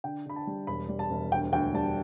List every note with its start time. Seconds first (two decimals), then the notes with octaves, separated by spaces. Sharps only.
0.04 D3 G5
0.26 D3 B5
0.36 A5
0.47 G3
0.67 E1 B5
0.89 G3
0.99 A5
1.10 E1
1.32 D2 G5
1.52 D2 G5
1.74 G3 A5